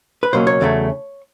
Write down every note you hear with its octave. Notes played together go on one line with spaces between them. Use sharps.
B4
C#2 B2 F#3 A#3 C#4 C5
C#5
E2 C#3 F#3 A3